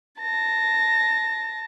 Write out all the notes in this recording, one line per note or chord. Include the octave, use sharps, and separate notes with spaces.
A5 A#6